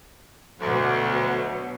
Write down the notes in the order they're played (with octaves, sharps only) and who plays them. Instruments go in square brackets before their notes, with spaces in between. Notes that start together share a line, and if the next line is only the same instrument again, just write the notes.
[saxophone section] D2 [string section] B2 F#3